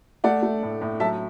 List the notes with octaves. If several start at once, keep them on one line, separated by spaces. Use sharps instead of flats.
A3 D5 F#5
A3
A2
A2
F#3 E5 A5